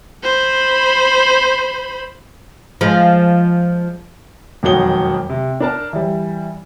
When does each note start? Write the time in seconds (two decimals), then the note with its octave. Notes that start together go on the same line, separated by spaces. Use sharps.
0.23 C5 B5
2.81 F3 G#3
4.63 E1 F2 D#3 F#3 F#5 G7
5.30 C3
5.60 D4 A#4 A5
5.93 E3 G3